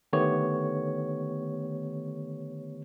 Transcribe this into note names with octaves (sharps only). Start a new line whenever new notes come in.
D3 D#3 A3 B3 G4 C#5